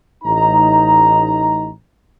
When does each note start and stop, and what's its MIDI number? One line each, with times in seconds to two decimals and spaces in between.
0.24 1.68 33
0.24 1.68 63
0.24 1.68 82